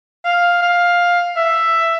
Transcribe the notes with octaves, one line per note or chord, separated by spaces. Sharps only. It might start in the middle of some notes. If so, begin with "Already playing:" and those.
F5
F5
E5